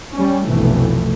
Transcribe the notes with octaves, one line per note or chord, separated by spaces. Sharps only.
G3 C#4
F1 B1 G2 B2 E3 A3